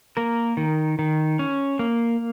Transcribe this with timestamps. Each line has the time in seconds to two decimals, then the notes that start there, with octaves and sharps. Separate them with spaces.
0.17 A#3 A#4
0.57 D#3
0.99 D#3
1.39 C#4
1.79 A#3